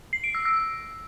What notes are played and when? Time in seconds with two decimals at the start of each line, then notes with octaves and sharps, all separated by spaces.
0.13 C7
0.24 D7
0.35 E6
0.45 E6